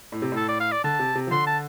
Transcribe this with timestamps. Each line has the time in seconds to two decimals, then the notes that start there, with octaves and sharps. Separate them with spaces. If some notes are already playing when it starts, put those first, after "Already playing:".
0.12 A2
0.22 C3
0.32 A2 A4
0.48 D5
0.60 F5
0.72 D5
0.84 D3 A5
0.99 C3
1.15 C3
1.27 F3
1.31 D3 C6
1.47 A5